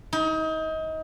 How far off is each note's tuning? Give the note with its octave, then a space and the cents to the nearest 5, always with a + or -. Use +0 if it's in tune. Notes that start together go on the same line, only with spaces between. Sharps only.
D#4 +30